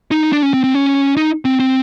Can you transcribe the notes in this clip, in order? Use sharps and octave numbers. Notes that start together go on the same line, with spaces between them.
D#4
D4
C#4
C4
C4
C#4
D#4
C4
C4